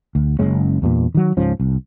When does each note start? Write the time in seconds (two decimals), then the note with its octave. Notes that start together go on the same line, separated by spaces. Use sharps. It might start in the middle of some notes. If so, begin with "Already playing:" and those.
0.15 D2
0.39 F#1 C#3 G#3 C#4
0.82 E2 G2 A#2
1.15 D#3 F#3
1.37 C#2 G#2 F3 C#4
1.60 C2